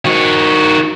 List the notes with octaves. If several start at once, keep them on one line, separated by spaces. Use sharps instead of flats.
D#3 F#4